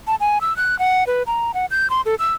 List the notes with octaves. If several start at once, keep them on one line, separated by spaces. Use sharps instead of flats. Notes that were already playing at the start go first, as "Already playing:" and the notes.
A5
G#5
E6
F#6
F#5
B4
A#5
F#5
G6
C6
A4
E6